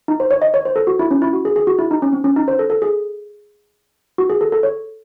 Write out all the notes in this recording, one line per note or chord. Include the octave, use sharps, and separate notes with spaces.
D#4
C5
C#5
D#5
C#5
C5
A4
F#4
E4
C#4
E4
F#4
G#4
G#4
F#4
E4
D#4
C#4
C4
C#4
D#4
C5
A4
A4
G#4
F#4
G#4
A4
A4
C#5